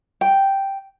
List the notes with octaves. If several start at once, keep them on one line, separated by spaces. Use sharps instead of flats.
G5